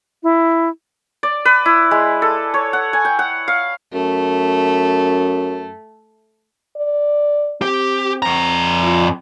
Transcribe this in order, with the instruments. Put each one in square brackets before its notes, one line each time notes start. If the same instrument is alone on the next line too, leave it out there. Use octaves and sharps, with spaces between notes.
[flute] E4
[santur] D5
B4
E4
G#3
A4
C#5
F#5
G#5
G5
F#5
F5
[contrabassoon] F#2 [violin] A3
[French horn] D5
[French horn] C4 [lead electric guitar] G4
[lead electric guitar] F2 A#5
[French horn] F4